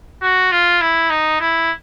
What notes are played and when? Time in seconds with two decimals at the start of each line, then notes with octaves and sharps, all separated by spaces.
0.22 F#4
0.52 F4
0.81 E4
1.10 D#4
1.40 E4